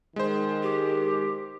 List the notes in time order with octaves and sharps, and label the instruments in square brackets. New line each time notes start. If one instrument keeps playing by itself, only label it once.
[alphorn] D#3 [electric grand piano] G#3 C5
[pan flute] G4